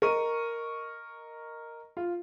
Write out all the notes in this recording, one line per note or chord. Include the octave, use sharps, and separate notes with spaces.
A#4 D#5 C#6 D#7
F4